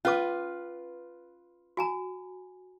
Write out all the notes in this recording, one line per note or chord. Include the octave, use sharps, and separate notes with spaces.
C#4 F4 B4 D6
F#4 G#5 A#5